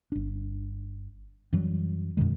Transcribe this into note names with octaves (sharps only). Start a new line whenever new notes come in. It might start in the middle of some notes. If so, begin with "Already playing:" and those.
G1 D4
F#2 E3 F#3 G3
F#2 B2 D#3 G#3